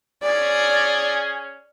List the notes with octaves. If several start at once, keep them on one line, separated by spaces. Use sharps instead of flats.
C#4 G#4 D5